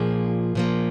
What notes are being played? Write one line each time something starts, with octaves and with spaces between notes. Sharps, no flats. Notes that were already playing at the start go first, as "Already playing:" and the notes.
Already playing: A#2 F3 A#3 G#4
A#2 F3 A#3